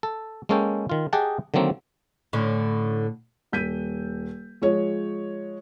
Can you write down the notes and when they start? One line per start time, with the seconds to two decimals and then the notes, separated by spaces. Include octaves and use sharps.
0.03 A4
0.49 G#3 A#3 C#4 A4 C#5 G5
0.89 D#3 F4
1.13 G4 G#4 D#5 F#5 G5 A5
1.54 D3 D#3 F#3 A#3 C4
2.33 A2 D3 C#4
3.52 D#1 G6 B6 D#7
4.62 F3 G#3 C#5